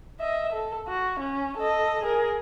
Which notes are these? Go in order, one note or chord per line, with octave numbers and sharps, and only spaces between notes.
D#5 E5
A4
F#4
C#4
A4 D#5
G#4 A#4